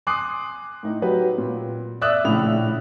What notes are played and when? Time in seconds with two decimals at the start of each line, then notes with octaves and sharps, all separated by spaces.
0.07 G#5 C6 D6 D#6 F#6 C7
0.83 A2 D#4
1.02 F#3 G4 B4
1.38 A#2
2.01 D5 E5 D#6 E6 F#6
2.24 A#1 A2 C#3 B5 F7